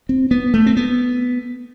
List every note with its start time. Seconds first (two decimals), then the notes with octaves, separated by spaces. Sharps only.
0.09 C4
0.31 B3
0.54 A3
0.66 C4
0.77 B3